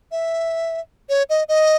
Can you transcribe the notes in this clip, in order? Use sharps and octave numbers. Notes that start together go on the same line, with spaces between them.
E5
C#5
D#5
D#5